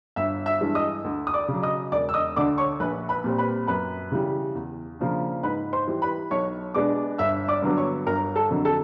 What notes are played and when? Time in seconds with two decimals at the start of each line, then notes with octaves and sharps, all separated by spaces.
0.16 G1 E5 E6
0.46 E5 E6
0.61 G2 E3 G#3
0.75 D#5 D#6
1.04 D2
1.27 D#6
1.34 D5 D6
1.48 C#3 F#3
1.62 D#5 D#6
1.92 E1 D5 D6
2.09 E6
2.14 D#5 D#6
2.36 D2 D3 D5 D6
2.58 C#5 C#6
2.80 A#1 B4 B5
3.09 B4 B5
3.24 A#2 G3 C4
3.38 B4 B5
3.67 F#2 B4 B5
4.12 C#3 E3 G3
4.55 E2
4.99 C#3 F3 A#3 D4
5.43 G#2 B4 B5
5.73 C5 C6
5.87 E3 G3
6.02 B4 B5
6.31 B1 C#5 C#6
6.74 B2 G#3 B3 D4 D5 D6
7.18 G1 E5 E6
7.48 D5 D6
7.62 G2 D3 F#3 B3
7.77 C#5 C#6
8.06 G1 A#4 A#5
8.36 A4 A5
8.50 F2 D3 F#3
8.65 A4 A5